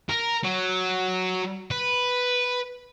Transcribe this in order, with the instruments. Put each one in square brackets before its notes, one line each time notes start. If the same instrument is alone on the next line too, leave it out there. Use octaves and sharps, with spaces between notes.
[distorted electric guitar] A#4
F#3
B4